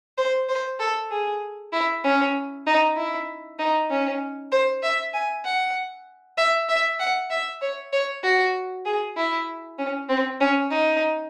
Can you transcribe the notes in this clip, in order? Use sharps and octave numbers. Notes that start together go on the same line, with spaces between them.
C5
C5
A4
G#4
E4
C#4
D#4
E4
D#4
C#4
C5
E5
G#5
F#5
E5
E5
F#5
E5
C#5
C#5
F#4
G#4
E4
C#4
C4
C#4
D#4